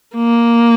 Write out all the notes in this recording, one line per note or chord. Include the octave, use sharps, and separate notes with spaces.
A#3